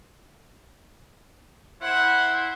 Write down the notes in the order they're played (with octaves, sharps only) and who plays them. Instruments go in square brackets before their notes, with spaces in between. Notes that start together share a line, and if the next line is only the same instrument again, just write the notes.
[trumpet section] E4 C5 [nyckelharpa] F#5